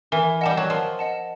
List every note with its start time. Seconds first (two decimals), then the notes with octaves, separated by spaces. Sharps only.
0.12 E3 A#4
0.41 G3 D#5 F#5 A5
0.57 F#3
0.70 F3 A#4
0.99 D#5 F#5 A5